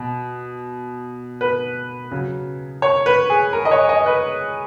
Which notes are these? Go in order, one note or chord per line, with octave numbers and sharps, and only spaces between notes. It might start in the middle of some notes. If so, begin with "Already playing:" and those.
Already playing: B2
B4
C#3 F#3
C#5
B4
G#4
A#4
D#5
C#5
D#5
B4